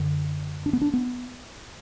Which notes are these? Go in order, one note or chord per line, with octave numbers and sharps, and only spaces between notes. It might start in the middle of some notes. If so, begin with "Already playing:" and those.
Already playing: F#2 D3
D4
B3
D4
B3